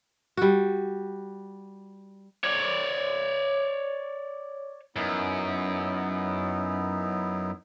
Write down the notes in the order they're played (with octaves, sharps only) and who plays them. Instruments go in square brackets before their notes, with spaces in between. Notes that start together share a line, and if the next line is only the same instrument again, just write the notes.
[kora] G3 F#4
[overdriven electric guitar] C#5 D5
[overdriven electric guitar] F#2 [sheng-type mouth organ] B3 D#4 E4